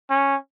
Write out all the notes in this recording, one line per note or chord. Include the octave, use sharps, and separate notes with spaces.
C#4